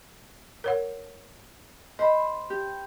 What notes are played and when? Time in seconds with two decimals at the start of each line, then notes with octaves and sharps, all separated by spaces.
0.64 A#4 C#5 F#5
1.99 C5 D#5 B5
2.50 G4